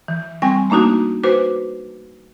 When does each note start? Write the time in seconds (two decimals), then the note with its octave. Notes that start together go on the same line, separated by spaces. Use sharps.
0.08 E3
0.42 G3 C4 G5 G#5 C#6
0.70 A3 A#3 D4 D#4 F#4
1.23 F#4 B4 C5 D6